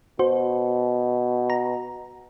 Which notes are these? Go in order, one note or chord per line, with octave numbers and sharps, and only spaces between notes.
B2 F#4 C5
A#5